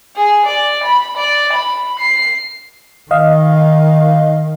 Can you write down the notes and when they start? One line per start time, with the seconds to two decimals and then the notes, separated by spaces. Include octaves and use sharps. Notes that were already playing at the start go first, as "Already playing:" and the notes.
0.16 G#4
0.46 D5
0.83 B5
1.17 D5
1.53 B5
1.99 C7
3.11 D#3 D#5 F5